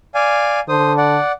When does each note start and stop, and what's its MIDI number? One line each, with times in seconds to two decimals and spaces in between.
0.15 0.60 74
0.15 0.60 77
0.15 0.60 80
0.69 1.18 50
0.69 0.93 72
0.69 0.93 87
0.97 1.32 74
0.97 1.32 78